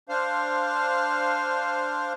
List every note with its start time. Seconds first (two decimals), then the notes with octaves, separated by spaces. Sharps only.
0.09 D4 C5 F5